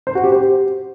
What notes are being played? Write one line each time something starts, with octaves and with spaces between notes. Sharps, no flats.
C5
F#4
G4
C5
G4